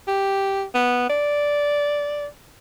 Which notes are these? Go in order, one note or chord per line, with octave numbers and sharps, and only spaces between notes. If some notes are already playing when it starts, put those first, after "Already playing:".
G4
B3
D5